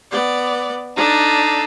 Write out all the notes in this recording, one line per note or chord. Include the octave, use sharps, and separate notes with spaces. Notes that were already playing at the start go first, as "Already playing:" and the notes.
B3 D5
D4 D#4 A4